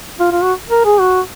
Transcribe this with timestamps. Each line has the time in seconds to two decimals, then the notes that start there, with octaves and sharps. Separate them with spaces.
0.20 F4
0.32 F4
0.43 F#4
0.70 A#4
0.85 G#4
1.00 F#4